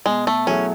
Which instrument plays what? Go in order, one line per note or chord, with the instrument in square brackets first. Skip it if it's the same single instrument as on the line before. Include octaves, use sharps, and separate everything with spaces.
[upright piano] B2 [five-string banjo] G#3
[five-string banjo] A3
[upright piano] F#3 A3 E4 G#4 [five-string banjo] C#4